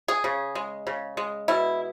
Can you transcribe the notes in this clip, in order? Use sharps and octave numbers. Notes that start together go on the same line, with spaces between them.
G#4
C#3
G#3
C#3
G#3
B2 E4